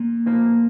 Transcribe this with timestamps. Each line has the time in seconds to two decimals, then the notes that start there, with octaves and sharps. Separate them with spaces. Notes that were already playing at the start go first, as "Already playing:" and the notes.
Already playing: A#2
0.26 A#2 F3 A#3